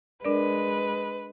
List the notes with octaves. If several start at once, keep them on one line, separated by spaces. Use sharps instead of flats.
G#3 D4 A#4 B4 D5